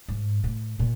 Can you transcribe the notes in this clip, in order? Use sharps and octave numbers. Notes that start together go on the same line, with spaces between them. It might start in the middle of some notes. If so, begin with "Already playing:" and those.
G#2
A2
A#2